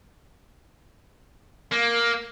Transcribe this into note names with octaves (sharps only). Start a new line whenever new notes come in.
A#3